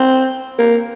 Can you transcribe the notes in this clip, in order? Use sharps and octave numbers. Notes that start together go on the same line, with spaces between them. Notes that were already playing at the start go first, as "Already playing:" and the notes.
Already playing: C4
A#3